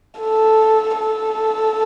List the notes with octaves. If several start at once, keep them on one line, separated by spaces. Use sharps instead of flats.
A4
A4